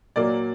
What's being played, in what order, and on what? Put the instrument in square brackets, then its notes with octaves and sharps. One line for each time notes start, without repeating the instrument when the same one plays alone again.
[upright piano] A#2 F#3 A#3 D5